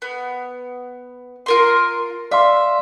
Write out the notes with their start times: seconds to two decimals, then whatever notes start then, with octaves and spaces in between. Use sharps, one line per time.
0.02 B3
1.46 F4 A#4 C6
2.31 D5 E5 F5 C6